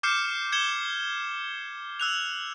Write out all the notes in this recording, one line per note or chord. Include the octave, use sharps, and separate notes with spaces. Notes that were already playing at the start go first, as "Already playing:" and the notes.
D6 F6 G6 C7 C#7 E7
G#6 C#7 E7 G7
E6 F#6 F7